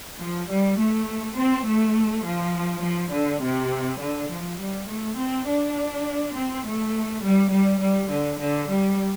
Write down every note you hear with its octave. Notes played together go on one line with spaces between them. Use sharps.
F3
G3
A3
C4
A3
F3
F3
D3
C3
D3
F3
G3
A3
C4
D4
C4
A3
G3
G3
G3
D3
D3
G3